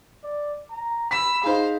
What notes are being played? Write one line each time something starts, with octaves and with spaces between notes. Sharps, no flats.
D5
A#5
B5 E6 B6
D#4 G#4 C5 F5